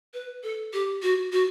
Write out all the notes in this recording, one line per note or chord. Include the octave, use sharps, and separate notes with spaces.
B4
A4
G4
F#4
F#4